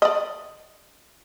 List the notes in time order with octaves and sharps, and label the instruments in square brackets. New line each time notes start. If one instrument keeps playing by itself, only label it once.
[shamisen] D5 D#5